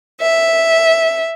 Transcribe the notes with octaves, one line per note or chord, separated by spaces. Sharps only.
E5